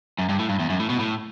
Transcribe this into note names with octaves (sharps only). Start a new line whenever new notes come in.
F#2
G2
A2
G2
E2
F#2
A2
B2
A2